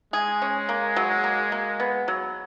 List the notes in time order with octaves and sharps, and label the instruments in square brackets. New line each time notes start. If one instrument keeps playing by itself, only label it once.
[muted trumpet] G#3 [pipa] G#4
[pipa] C#4
A#3
F#3
A#3
A#3
B3
F#3